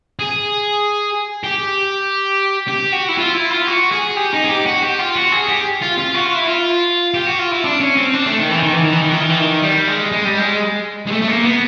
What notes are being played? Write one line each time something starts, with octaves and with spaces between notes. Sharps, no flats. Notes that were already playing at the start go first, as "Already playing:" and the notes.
G#4
G4
G4
F#4
E4
F4
E4
F4
F#4
G#4
G4
D#4
G#4
G4
F#4
G4
F4
F#4
G#4
G4
F4
F4
F#4
F4
E4
F4
G4
F#4
F4
E4
D4
C#4
C4
D4
A3
D#3
E3
D#3
E3
D#3
E3
D#3
E3
D#3
E3
D#3
G3
G#3
G#3
G3
G#3
G#3
A3
A3
A#3
B3